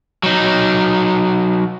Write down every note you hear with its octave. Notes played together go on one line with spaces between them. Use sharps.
F#3 D#4